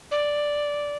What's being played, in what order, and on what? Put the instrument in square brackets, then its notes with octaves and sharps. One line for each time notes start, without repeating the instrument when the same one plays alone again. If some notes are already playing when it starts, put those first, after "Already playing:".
[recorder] D5